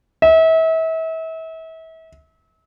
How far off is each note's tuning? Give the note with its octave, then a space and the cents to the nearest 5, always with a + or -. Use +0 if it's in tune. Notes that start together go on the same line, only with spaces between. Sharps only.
E5 -35